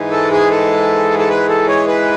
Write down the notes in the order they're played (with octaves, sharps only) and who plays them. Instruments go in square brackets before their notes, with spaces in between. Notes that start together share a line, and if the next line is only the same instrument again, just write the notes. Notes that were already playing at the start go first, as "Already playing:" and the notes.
Already playing: [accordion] G#2 E3 G#3
A4
G#4
A4
A4
B4
A4
C#5
B4